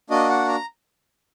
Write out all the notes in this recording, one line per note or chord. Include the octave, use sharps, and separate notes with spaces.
A#3 D4 F#4 D#5
F#5
A#5